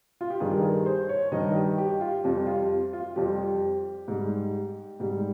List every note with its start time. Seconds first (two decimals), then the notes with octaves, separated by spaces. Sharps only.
0.21 F4
0.30 G4
0.40 G2 D#3 G3 G#4
0.53 A#4
0.63 G#4
0.86 C5
1.09 C#5
1.31 G2 D#3 G3 D#5
1.55 G4
1.78 G4
2.01 F4
2.24 F2 C3 G3 G4
2.47 F4
2.93 F4
3.16 F2 C3 G3 G4
4.08 G#2 G3
5.00 G#2 G3